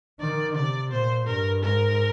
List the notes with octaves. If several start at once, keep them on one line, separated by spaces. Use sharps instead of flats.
D#3 D5
C3 D5
A#2 C5
G2 A#4
G#2 A#4